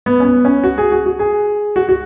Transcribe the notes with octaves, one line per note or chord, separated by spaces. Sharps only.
B3
C#4
B3
C#4
F#4
G#4
F#4
F#4
G#4
F#4
F#4